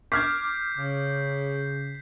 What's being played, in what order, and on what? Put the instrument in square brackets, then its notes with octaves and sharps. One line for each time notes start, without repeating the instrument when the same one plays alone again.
[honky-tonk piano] D6 F6 G#6 [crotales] G6 B6 C7
[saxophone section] C#3